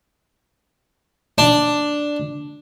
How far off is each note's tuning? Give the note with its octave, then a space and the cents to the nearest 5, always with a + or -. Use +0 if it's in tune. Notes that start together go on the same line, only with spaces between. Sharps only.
D4 +0